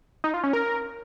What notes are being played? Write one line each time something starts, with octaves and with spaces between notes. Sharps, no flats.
D#4
F4
C#4
A#4